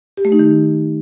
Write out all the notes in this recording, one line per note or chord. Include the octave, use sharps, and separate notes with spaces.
G4
A3
D#4
D#3